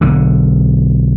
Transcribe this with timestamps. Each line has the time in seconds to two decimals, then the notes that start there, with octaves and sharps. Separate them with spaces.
0.01 B1 D3